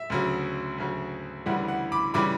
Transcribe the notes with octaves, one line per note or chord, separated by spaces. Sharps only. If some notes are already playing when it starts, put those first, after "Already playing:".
Already playing: E5
D2 C#3 F#3
D2 C#3 F#3
D2 C#3 E3 G3 F#5
F#5
B5 D6
C#3 E3 G3 B5 D6